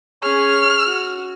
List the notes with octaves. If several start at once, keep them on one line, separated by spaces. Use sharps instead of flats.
C#4 G#4 C#5 F6
F#4